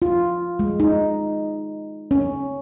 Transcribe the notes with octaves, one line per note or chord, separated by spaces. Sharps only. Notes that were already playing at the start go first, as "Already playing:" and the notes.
F4
G#3
D#4
C#4